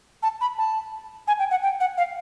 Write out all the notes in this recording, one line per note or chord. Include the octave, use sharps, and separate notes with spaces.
A5
B5
A5
G#5
G5
F#5
G5
F#5
F5